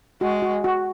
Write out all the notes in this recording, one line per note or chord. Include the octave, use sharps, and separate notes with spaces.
G#3 F#4
F#4
F#4